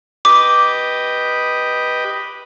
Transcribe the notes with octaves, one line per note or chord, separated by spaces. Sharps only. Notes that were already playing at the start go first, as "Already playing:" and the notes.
G4 B4 D#5 D6